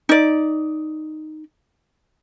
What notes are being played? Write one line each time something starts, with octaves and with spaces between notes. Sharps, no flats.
D#4 D5